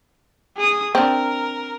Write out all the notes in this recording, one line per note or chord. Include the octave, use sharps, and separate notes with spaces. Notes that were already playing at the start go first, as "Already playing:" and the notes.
G#4 D#6
C4 D4 A#4